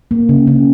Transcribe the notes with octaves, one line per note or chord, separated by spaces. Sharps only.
A#3
C#3
C#3